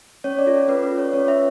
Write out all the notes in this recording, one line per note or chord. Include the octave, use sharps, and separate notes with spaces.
C#4 C#5
D5
F4 A4
C#4 B4
B4
F4 A4
C#5
C#4 C#5
E5